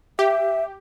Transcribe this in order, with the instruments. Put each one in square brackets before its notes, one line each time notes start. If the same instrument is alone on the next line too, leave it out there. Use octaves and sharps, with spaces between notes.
[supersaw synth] G4 [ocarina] E5